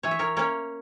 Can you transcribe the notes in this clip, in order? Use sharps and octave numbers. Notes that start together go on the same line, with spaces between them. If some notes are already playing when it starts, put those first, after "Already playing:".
E3 C#5
E5
A#4 C#5
A#3 C#4 A#4 C#5